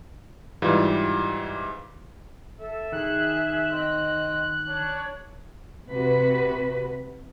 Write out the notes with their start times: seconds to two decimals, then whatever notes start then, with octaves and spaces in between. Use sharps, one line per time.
0.62 G#2 E3 G3 F4
2.59 A4 E5
2.92 D#3 G#4 F#6
3.71 C4 D#5
4.67 D4 C#5
5.90 C3 F#4 B4